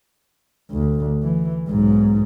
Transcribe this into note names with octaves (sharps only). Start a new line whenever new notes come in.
D2
E3
B1 G#2